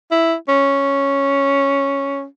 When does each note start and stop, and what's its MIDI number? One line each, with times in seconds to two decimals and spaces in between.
0.11 0.35 64
0.48 2.24 61